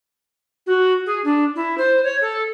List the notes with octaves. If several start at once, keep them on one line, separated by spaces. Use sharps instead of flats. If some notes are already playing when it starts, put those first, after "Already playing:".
F#4
G#4
D4
E4
C5
C#5
A4